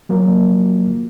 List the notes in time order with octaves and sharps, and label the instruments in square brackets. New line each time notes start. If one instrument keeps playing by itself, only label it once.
[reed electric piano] F3 F#3 A#3